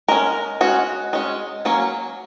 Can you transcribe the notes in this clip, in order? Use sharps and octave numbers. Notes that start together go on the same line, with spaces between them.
G#3 C#4 A#4
G#3 C#4 F#4
G#3 C#4
F#3 A#3 C#4